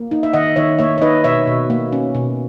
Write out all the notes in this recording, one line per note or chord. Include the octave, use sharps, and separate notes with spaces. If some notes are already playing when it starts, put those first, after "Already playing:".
Already playing: A#3
D#4
E5
D#3 D#5 F#5
D#3 C#5 E5
A#3 C#5 E5
C#5
D#4 B4 D#5
B2 C#5 E5
B2
A#3
C#4
B2